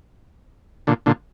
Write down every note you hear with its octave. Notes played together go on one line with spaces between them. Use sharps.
A#2 D3
A#2 D3